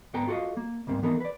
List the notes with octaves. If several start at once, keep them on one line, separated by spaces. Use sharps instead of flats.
G#2 B3 A4 G5 A#5
F4 F#4 A4 D#5 F5
A#3
C2 G#2 A#3 C4
E3 B3 D#4 A4 A#4
B4 D5